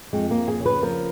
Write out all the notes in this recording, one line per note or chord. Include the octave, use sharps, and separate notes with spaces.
F2 G#3
F2 A#3
G#4
C#3
B4
F3 A#4